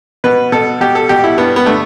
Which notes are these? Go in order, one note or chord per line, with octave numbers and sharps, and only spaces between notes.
B2 B4
B2 A4
B2 G4
A4
B2 G4
E4
G2 B3
B3
D3 A3